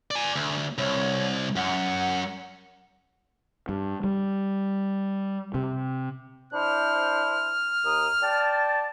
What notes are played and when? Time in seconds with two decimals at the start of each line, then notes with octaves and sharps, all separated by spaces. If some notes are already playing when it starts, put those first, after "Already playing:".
0.11 D5 G#5
0.35 D2
0.78 C2 C#5
1.56 F#2 F#5
3.69 G2
4.04 G3
5.54 C3
6.53 D4 E4 C5 F6
7.85 D#2 A#4 D#6
8.23 D5 G5 A5